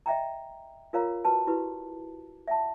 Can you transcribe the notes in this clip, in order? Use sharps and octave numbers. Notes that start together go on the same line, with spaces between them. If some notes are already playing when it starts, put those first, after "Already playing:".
D#5 E5 G5 A#5
F4 A#4 C#5 F5 A#5
F#4 B4 A5
E4 F#4 G4 B4
E5 F#5 A5